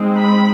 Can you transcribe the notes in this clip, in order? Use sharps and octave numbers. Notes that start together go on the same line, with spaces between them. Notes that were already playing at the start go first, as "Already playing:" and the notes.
Already playing: G#3 C4 D#4
B5